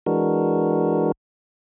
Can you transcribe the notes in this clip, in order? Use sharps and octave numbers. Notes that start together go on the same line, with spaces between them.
E3 G#3 D4 F#4 A#4